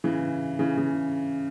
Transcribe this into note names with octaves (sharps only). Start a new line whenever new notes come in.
C#3 E3
C#3 E3
C#3